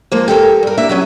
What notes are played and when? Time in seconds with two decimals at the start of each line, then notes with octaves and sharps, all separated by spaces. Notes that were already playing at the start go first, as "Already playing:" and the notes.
0.12 F3 G#3 A#3
0.28 G4 A4 A#4
0.63 G2 A#4
0.77 G3 A#3 D4 E5
0.89 F#3 B3 C#4